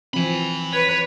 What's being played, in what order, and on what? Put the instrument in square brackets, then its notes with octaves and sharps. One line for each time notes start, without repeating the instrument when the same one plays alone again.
[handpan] E3 F3 C4 [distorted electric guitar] G#5 B5
[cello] B4 [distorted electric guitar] C#5